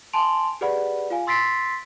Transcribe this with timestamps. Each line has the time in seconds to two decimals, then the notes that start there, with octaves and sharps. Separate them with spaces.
0.13 G#5 A5 C6 D7 F7
0.61 G4 G#4 B4 D5 F#5 B5
1.10 F4 F5 G#5
1.27 C6 E6 A6 B6 C7 D7